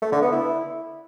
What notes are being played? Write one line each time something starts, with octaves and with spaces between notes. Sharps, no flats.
A3
D3
B3
E4